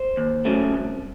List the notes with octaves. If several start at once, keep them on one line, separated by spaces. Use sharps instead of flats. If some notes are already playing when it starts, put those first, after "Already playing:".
Already playing: C5
D#2
C#3 F#3 A3
C2